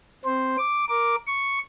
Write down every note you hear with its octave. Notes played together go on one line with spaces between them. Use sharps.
C4 C5
D6
A#4 D6
C#6